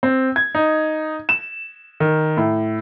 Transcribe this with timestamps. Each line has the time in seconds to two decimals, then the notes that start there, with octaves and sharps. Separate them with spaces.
0.03 C4
0.36 G#6
0.55 D#4
1.29 E7
2.00 D#3
2.37 A2